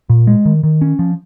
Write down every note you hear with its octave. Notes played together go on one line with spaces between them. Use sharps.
A#2
G#3
D#3
D#3
C#4
F3